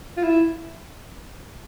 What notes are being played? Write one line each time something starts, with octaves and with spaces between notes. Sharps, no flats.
F4
E4